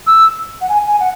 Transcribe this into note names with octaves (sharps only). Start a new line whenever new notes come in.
E6
F#5
G#5
G#5
F#5